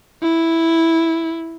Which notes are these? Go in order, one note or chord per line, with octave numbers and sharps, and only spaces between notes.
E4